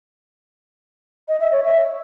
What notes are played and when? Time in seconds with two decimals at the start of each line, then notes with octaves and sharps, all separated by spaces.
1.28 D#5
1.40 E5
1.52 C#5
1.63 E5